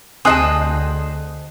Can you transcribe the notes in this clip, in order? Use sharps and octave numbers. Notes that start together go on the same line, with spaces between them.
D2 C4 G#4 D#5 G5 A5 D#6 F#6